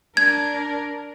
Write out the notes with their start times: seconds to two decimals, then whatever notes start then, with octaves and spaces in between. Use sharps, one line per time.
0.17 D4 A#4 G#6